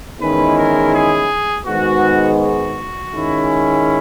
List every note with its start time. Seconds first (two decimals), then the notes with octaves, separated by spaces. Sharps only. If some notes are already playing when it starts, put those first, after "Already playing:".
0.19 E2 D#3 G#3 C#4 E4 B4
0.56 A#4
0.93 G#4
1.65 G#2 D#3 G#3 B3 F#4
2.39 F#4
3.12 D#3 G#3 C#4 E4